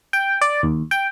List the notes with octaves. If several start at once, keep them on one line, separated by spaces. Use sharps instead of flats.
G5
D5
D#2
G5